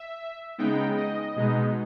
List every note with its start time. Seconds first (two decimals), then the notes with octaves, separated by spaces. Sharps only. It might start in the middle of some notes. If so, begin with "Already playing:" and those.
Already playing: E5
0.58 C#3 G#3 B3 D#4 G5
0.97 D#5
1.36 B2 G#3 B3 D#4